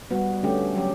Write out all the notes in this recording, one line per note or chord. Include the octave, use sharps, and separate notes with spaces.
G3 B3 F#4
D3 A3 C#4 G4
F#3 C#4 G4